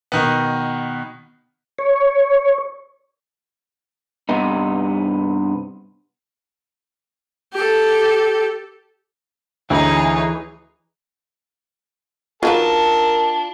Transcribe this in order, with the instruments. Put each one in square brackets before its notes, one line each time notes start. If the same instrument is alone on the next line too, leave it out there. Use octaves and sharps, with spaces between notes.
[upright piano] B2 D#3 B3
[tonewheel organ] C#5
[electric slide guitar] G2 C3 B3 D#4
[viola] G4 A4
[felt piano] D2 [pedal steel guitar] E3 G#4 [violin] D#4 C#5
[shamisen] F#3 D#4 B4 [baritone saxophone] D4 [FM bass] F4 [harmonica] A#4 A5